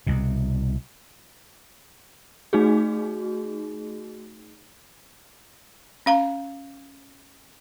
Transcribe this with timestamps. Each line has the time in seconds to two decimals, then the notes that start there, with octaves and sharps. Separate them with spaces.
0.07 C2 B2
2.53 A3 D#4 F#4 G#4
6.06 C#4 F5 A#5